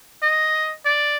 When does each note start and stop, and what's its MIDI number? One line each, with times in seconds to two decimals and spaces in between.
0.23 0.72 75
0.85 1.17 74